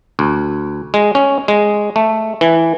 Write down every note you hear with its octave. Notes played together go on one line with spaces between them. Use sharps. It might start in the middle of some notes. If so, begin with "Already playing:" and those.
D2
G#3
C#4
G#3
A3
E3